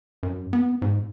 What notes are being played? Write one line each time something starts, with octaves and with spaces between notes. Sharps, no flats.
F#2
B3
G#2